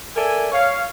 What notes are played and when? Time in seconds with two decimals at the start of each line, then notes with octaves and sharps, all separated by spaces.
0.16 A4 A#4 D5 E5 G#5
0.52 C#5 F5